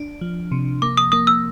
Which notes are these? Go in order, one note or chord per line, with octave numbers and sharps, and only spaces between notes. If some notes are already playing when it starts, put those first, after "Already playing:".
Already playing: D4
F3
C3
A#3 D6
D#6
A#3 D#6
E6